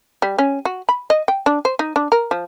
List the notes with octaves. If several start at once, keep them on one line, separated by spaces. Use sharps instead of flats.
G3
C#4
F#4
B5
D#5
G5
D4
C5
D#4
D4
A#4
F3